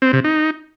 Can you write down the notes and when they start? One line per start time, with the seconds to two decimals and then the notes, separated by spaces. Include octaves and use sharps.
0.02 C4
0.13 C3
0.24 D#4